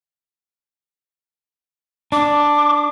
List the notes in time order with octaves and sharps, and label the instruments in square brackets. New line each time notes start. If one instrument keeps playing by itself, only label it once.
[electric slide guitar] D4 [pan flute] D6